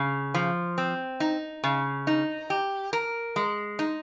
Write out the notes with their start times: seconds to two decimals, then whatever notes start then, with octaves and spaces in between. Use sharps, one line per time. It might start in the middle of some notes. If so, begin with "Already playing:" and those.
Already playing: C#3
0.34 F3
0.78 C4
1.20 D#4
1.64 C#3
2.07 D#4
2.50 G4
2.93 A#4
3.36 G#3
3.79 D#4